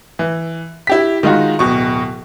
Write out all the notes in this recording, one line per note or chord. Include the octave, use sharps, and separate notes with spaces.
E3
E4 G4 B6
D#3 G#3 D#4 F4 F#4
D1 B2 C#6